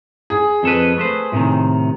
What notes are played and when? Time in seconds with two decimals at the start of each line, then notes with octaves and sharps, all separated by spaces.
0.30 G#4
0.63 F2 A4 B4
0.98 A3 B4 C5
1.32 A2 C3 D#3